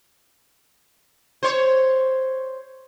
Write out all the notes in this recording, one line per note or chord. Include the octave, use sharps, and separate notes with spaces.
C5 C#5